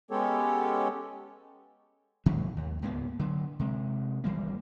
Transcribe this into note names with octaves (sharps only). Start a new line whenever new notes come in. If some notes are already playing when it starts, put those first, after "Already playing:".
G#3 B3 C#4 G4 A4 C#5
G#2 D#3 F#3 G#3
D#2
C#2 G#2 A#3 B3
D3 F#3
C3 G#3
G#1 E3 G3 A#3